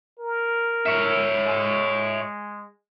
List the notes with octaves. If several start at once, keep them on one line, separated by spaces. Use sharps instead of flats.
A#4
C#5 E5
G#3